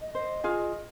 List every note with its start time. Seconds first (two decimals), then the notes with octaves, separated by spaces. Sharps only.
0.01 D#5
0.15 C5 D#5
0.44 F4 G#4 F5